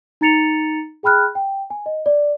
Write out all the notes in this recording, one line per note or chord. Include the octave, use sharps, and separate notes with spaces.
D#4 A#5 A6 C#7 F7
G#4 G5 B5 F6 F#6
G5
G#5
D#5
D5